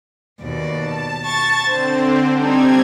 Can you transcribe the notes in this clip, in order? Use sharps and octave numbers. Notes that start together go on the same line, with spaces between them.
D#2 B2 D5
A5
A5 C#6 A6
D3 C4 C5
G3 C4 D4 D#4 G#6